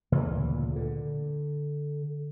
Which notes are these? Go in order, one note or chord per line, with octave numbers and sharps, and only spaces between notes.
D2 A#2 C#3 E3
D3